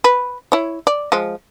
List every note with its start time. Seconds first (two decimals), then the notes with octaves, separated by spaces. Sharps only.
0.04 B4
0.52 E4 C#5
0.87 D5
1.12 F3 G#3